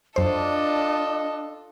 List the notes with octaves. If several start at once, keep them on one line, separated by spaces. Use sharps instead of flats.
F#2 D4 F4 A4 C5 D#5